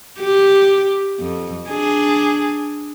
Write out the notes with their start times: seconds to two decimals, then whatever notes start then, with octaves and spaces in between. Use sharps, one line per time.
0.19 G4
1.19 F2
1.69 D4 G#4